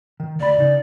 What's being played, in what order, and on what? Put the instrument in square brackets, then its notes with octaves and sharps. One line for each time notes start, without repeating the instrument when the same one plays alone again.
[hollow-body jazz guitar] D#3
[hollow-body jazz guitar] D2 B5 [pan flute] D5
[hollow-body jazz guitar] C#3 D#4